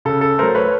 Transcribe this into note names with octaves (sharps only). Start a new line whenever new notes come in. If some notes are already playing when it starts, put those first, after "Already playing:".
C#3 A4
A4
F#3 A3 A#4 C5
B4 C#5